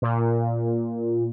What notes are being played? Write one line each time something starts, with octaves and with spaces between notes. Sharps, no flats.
A#2